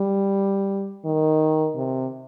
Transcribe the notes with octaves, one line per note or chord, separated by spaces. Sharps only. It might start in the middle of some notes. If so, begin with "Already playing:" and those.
Already playing: G3
D#3
C3